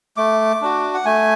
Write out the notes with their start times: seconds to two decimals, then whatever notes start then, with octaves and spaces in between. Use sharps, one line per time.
0.17 A3 D6
0.61 D4 F#4
0.94 F#5
1.05 A3 G#5